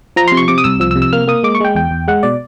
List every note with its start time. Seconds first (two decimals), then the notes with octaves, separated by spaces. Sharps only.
0.16 F3 A#5
0.28 C3 C6
0.37 C#6
0.48 C3 D6
0.58 D#6
0.64 C2 E6
0.80 F3 E6
0.91 E6
0.96 C3
1.02 E6
1.13 A#3 F6
1.28 A#3 D#6
1.43 G#3 D6
1.55 C#6
1.60 G#3 G5
1.75 E2 G5
1.91 E2
2.08 G#3 F#5
2.23 B2 D5